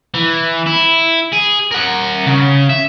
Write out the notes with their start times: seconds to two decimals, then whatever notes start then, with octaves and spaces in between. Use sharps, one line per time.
0.14 E3
0.67 E4
1.33 G#4
1.71 A#4 F#5
2.26 C#3
2.69 E5